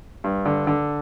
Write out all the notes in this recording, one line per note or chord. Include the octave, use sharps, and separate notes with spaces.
G2
D3
D3